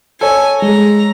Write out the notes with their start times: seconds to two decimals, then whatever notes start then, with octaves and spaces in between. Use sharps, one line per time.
0.21 A4 C#5 G#5
0.62 G#3 A#5